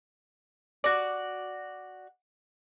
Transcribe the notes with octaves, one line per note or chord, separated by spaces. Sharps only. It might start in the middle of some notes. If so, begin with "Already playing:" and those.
F#4 D5